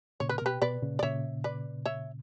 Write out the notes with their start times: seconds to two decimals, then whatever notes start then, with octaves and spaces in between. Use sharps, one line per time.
0.20 A#2 C#3 C#5
0.29 B4
0.38 A#4
0.42 B2 G4 B4
0.62 B2 B4 D5
0.82 A#2 C#3
0.99 D5
1.03 A#2 C#3 C#5 E5
1.44 B4 D5
1.86 C#5 E5